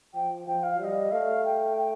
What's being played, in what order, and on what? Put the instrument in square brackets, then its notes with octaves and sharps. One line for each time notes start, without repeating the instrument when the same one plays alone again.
[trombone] F3 [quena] G5
[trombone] F3 [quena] G5
[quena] F5
[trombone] G3 [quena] D#5 F5
[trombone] A3 [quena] F5
[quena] G5
G5